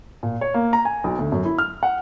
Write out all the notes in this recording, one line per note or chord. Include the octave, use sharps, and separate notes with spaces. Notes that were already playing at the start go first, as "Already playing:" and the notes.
A#2
C#5
A#3
A#5
G#5
B1
D2
F#2
E4
F6
F#5